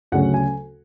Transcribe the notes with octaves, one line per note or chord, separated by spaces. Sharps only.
D2 C#3 F#3 C#4 F#5
G#5